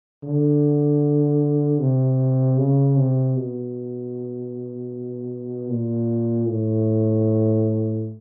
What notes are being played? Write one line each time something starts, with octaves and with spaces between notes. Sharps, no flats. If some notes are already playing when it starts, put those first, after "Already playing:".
D3
C3
C#3
C3
B2
A#2
A2